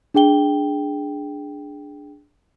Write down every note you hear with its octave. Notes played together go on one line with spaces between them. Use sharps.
D4 G#4 G5 G7